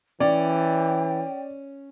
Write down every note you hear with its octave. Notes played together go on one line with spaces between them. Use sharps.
E3 C#4 D5 G5